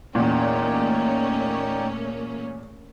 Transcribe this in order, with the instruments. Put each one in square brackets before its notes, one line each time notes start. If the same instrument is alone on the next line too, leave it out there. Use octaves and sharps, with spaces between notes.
[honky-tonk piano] E2 A#2 [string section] A3 A#3 C#4 [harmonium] D#4 D5 G5